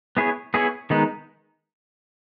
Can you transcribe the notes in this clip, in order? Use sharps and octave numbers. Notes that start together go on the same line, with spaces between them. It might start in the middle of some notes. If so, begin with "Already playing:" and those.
B3 E4 G#4 C#5
B3 E4 G#4 C#5
D#3 G#3 B3 D#4